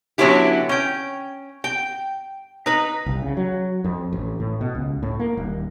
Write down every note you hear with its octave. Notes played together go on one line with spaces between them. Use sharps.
D3 F#3 B3 C#4 E4 G4
C#4 G5
G5
D#4 B4
C2
C#3
F#3
F2
A1
A2
B2
C#2
A2
A#3
D#1